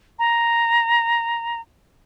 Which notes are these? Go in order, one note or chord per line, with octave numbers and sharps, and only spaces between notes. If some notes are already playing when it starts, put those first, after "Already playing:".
A#5